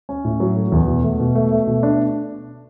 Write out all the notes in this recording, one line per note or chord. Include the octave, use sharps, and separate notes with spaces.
C#4
A2
F#3
A3
E2
B2
A3
B2
A3
A3
B2
D4